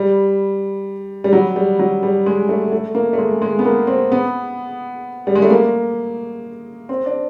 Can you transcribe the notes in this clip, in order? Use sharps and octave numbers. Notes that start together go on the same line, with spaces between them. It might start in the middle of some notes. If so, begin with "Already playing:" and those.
Already playing: G3
G3
F#3
G3
F#3
G3
G#3
A3
A3
A#3
A3
G#3
G#3
B3
A#3
C4
B3
G3
G#3
A3
A#3
C4
D4